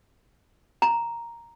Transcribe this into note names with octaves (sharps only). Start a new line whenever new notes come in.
A#5